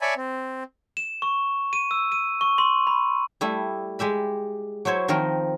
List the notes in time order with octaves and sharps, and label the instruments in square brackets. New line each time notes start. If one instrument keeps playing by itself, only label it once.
[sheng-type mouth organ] C#5 D5 E5 G#5 A5 B5
C4
[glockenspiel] E7
C#6
D#7
E6
D#7
C#6
C6
B5
[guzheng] G3 A3 E4
G#3 G4 E5 B5
F#3 E4 C5 C#5
D#3 F3 C4 D#4 A#4